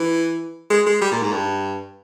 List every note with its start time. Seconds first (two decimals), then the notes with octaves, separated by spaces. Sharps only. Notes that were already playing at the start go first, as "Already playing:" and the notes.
Already playing: E3
0.70 G#3
0.86 G#3
1.01 G3
1.12 A#2
1.22 G#2
1.32 G2